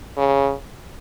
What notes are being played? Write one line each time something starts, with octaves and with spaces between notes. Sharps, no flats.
C#3